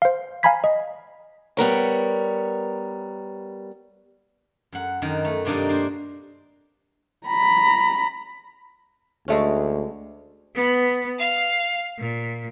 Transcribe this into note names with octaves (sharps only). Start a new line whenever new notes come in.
C5 F5
F5 G#5 A#5 B5 G#6 B6
D#5
G3 B3 A#4 C#5
F#2 F#5
F#2 D#3
A3
G2 C3 A#3 D4 D#4 A4
A#3 D4 C5
A#5 B5
D2 G#3 A3 C#4
B3
F5
A#2